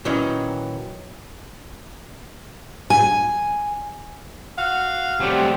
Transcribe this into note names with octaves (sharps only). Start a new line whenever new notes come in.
A#2 D#3 E3 F#3 C#4 D#4
G#5
F#4 F5 F#5
F#3 G3 A3 C4 G4